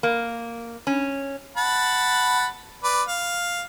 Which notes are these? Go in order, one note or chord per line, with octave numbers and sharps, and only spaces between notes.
A#3
C#4
F#5 A5 B5
B4 D5
F5